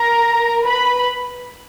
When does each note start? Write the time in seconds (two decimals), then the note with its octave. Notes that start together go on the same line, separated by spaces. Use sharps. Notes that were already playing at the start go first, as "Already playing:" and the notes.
Already playing: A#4 A#5
0.65 B4 B5